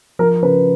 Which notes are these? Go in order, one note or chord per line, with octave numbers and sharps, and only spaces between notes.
F3 A#4
C#3 B4